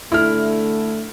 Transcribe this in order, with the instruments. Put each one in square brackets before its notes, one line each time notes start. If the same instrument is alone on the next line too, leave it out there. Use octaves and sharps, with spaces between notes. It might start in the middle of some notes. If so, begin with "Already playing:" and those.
[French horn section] D3 A3 [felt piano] E4 F6